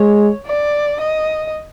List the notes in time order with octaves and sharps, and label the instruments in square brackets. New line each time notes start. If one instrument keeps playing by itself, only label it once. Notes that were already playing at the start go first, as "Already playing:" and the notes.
Already playing: [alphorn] G#3 [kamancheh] C#5
[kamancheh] D5
D#5